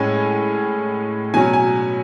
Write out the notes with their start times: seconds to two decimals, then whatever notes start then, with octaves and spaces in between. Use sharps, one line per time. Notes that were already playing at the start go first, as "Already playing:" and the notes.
Already playing: A2 G#3 C#4 G#5
1.34 B2 F#3 C#4 G#5
1.53 G#5